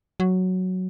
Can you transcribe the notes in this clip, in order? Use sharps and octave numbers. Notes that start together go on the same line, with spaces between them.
F#3